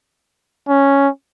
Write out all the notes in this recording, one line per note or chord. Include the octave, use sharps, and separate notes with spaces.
C#4